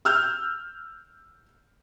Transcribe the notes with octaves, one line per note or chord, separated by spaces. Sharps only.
E6 F6 G6